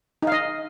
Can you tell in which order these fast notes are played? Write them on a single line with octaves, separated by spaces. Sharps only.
D#4 F5 D#5